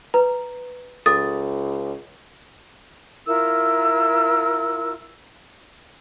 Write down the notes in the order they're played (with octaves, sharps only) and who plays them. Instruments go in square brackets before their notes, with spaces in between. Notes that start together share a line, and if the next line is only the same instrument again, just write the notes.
[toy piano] B4 [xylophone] A#5
[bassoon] C#2 [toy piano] A4 D6 [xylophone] D#6 A6
[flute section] E4 F4 A#4 E6